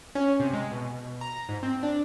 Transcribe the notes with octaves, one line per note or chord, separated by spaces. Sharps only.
C#4
C3
G#3
B2
A#5
G#2
C4
D4